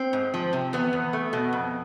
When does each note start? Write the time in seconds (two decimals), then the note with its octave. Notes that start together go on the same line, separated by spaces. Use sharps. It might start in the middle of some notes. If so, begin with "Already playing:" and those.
Already playing: C4
0.13 G#2
0.34 F3
0.53 C3
0.73 E2 B3
0.93 E2
1.13 A3
1.33 B2
1.53 F2